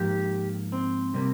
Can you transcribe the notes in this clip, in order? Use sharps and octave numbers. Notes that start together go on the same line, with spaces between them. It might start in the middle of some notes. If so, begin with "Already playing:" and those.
Already playing: G#2 F3 A#3 G4
C4
C3 G3 A#3